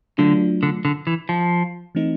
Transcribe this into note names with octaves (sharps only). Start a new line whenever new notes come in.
D3 F#3 A3 D4 F4
D3
D3
E3
F3
E3 A3 C4 D#4